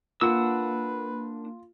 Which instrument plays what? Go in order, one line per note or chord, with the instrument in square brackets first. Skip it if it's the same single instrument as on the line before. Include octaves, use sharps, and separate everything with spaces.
[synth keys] A#3 [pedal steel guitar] D4 F#5 E6 [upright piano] F4 [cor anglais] B4